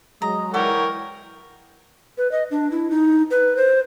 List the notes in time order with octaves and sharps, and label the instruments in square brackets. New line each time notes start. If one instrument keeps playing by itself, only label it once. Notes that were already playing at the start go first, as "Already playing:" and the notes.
[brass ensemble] F#3 G#3 [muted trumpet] D#5 [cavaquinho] A#5
[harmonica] E3 A#4 G5 [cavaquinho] F#4 D5 E5 [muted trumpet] C#5
[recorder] B4
D#5
D4
E4
D#4
B4
C5